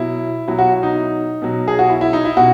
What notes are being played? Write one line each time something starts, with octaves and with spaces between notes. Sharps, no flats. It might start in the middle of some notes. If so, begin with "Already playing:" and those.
Already playing: B2 F#3 E4
B2 F#3 E4
F#4
E4
D#4
B2 F#3
G#4
F#4
E4
E4
D#4
E4
B2 F#4